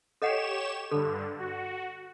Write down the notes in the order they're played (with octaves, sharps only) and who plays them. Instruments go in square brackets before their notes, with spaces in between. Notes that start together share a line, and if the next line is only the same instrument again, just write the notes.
[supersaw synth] G4 C#5 E7 [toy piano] A4 D#5 F#5
[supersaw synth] G2 D3 [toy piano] A4
[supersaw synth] F#4